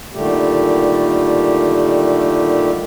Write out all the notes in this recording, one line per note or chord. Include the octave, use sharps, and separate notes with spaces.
A#2 D3 D#3 G3 A3 G4